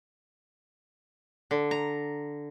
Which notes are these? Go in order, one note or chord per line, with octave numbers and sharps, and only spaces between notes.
D3
A#5